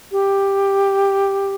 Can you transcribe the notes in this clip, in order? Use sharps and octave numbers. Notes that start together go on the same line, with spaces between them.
G4